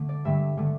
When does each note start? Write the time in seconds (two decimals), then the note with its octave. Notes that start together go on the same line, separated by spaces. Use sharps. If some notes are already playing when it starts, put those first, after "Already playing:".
Already playing: D3 A3
0.09 D5
0.25 G2 D3 A3 E5
0.57 D3 A3